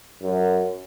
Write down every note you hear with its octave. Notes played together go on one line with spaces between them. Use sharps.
F#2